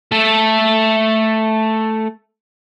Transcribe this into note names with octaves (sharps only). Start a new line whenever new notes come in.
A3 A4